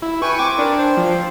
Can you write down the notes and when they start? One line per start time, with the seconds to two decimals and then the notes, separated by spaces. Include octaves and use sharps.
0.02 E4
0.22 B4 G5 G#5 C#6
0.39 C4 D6
0.59 D4 A#4
0.78 C5
0.97 F3